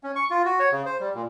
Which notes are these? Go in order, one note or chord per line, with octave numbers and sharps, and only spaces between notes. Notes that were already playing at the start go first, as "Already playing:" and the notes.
C#4
C#6
F4
F#4
C#5
C#3
C5
G3
A#2